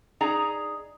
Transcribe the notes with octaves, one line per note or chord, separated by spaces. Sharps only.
D#4 G#4 D5 A#5